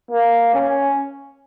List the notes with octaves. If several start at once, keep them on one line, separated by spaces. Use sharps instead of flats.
A#3
C#4